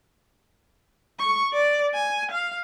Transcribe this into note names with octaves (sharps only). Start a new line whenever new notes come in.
C#6
D5
G#5
F5